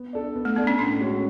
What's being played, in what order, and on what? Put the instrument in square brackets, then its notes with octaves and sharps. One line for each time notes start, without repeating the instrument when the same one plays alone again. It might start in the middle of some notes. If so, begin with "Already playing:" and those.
Already playing: [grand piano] B3
D4 A4 D5
B3
[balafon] A3
[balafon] B3 [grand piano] D4 A4 D5
[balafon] C#4
[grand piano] A2 [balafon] D4
[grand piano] G#3 C#4 F#4 A4